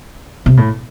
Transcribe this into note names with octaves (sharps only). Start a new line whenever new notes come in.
C3
A2